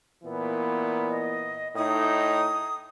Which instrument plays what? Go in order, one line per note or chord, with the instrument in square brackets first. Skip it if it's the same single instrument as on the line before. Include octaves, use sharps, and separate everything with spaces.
[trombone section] A#2 E3 B3
[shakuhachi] D#5
[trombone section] A2 D#4 [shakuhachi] D#6